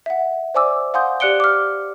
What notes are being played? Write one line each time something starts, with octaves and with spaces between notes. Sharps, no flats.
E5 F#5
C5 D5 G#5 D6 E6
F5 F#5 G#5 C6 D#6 G6
G4 D5 F#6 C#7 D7 G7
D6 F6